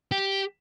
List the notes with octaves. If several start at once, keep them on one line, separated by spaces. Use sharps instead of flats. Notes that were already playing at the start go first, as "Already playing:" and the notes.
G4